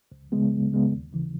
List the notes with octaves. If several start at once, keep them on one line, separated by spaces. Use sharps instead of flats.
C#2
C#3 G#3 B3
C#2
C#3 G#3 B3
D#2
C#3 E3